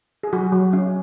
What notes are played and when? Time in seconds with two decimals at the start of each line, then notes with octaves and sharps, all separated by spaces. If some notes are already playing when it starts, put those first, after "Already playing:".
0.23 G#4
0.33 F#3 F#4
0.52 F#3
0.73 C#4